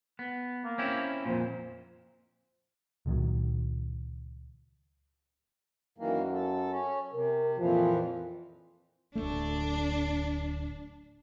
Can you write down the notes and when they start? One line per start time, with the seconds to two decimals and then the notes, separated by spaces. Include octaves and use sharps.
0.19 B3
0.64 A#3
0.78 C4 C#4 E4
1.25 F2 A#2 C5
3.06 C#2 A#2 D#3 F#3
5.98 F#2 D#3 E3 A#3
6.33 A4
6.71 C#4
7.13 C3 A#4
7.57 F2 A#2 E3 F3
9.15 D1 G1 A3 D4